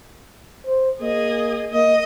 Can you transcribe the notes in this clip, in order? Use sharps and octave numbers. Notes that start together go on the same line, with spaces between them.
C5
A#3 G#4 D#5
A#3 D#5